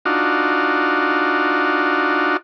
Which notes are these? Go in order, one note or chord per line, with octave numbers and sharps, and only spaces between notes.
D4 D#4 F4 F#4